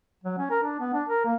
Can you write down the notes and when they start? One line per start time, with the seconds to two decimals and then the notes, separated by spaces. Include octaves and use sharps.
0.23 F#3
0.38 C#4
0.51 A#4
0.63 D4
0.80 B3
0.93 D4
1.09 A#4
1.25 A#3